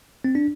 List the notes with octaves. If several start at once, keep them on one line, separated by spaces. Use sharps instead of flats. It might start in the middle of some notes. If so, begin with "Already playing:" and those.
C4
D4